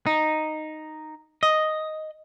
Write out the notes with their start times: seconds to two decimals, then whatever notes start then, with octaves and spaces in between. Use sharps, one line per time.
0.06 D#4
1.43 D#5